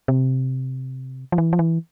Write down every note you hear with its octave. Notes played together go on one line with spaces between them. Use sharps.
C3
F3
E3
F3
E3